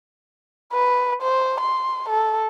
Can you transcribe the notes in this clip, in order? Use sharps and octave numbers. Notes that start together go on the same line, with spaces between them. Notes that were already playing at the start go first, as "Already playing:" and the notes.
B4
C5
C6
A4